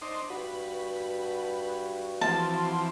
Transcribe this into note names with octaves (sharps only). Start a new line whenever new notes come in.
D4 D#4 C5
G2 F#4 B4
E3 F3 C4 A5